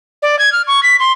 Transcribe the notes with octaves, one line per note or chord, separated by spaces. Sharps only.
D5
G#6
F6
C#6
B6
C6